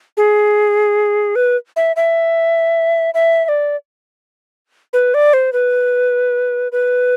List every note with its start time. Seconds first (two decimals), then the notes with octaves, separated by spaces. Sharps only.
0.17 G#4
1.36 B4
1.76 E5
1.96 E5
3.14 E5
3.45 E5
3.49 D5
4.93 B4
5.14 D5
5.33 C5
5.53 B4
6.72 B4